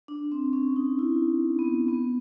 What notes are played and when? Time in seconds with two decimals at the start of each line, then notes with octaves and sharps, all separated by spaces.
0.08 D4
0.32 C4
0.53 C#4
0.76 D#4
0.99 E4
1.59 B3
1.88 B3